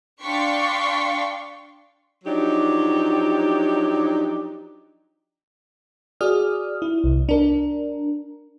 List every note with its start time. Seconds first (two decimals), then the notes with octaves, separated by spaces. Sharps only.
0.21 D4 F5 G5 C6 C#6 B6
2.24 F3 F#3 D4 D#4 G4
6.21 F#4 G#4 D5 D#6 F6
6.82 E4
7.04 C2
7.29 D4 A#4